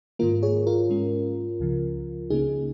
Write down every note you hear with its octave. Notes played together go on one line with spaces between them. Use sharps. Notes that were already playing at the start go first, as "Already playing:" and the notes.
G#2 D#3 A#3 F4 A#4
G#4 C#5
F4 A#4
G#2 G#3 C#4
C#2 C#3 F3
C#2 C#3 A#3 C#4 D#4 G#4